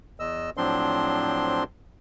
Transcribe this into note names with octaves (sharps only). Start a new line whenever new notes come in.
E2 D#5 E6
A2 F3 F#3 C4 D4 C6